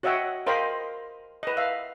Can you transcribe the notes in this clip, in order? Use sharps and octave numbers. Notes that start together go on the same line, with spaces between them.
F#4 C#5 D#5 E5 F#5 G5
A#4 C5 D#5 F5 G5 B5
B4 D#5
E5 F5